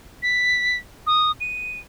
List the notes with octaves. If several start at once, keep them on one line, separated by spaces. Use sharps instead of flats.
B6
D#6
D#7